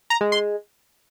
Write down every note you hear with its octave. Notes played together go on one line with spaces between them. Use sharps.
A#5
G#3
C6